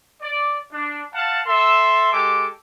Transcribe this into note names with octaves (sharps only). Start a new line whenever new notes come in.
D5
D4
F5 F#5 A5
A4 E5 C6
G#3 G4 A4 D6